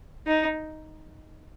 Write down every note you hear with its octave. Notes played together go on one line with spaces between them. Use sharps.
D#4